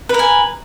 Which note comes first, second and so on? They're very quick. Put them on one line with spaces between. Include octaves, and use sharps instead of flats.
B4 A#4 G#5